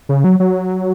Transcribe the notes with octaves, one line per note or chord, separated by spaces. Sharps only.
C#3
F#3
F#3